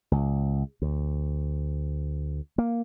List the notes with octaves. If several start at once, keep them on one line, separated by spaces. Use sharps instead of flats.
C#2
D2
A#3